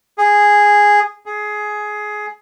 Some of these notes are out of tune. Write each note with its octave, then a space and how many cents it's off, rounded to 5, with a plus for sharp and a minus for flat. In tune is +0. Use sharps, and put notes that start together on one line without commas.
G#4 -5
G#4 +15